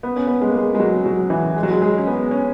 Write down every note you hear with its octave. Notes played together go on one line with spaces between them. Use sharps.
B3
C#4
B3
G#3
A#3
G#3
G#3
F#3
F#3
E3
G#3
F#3
G#3
G#3
C#4
B3
C#4